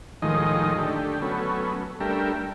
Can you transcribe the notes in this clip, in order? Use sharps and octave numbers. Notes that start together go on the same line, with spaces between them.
D#2 A2 D#3 F3 G#3 D#5
D3 A3 G4
F#3 A3 B3 C#4
G3 A3 D4 G4 A#4 E5